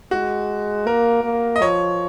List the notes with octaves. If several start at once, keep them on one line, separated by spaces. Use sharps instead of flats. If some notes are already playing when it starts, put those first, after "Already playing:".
G#3 F#4
A#3 A#4
A#3
D#5
F3 C#5